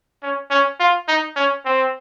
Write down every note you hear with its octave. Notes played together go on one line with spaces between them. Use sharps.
C#4
C#4
F4
D#4
C#4
C4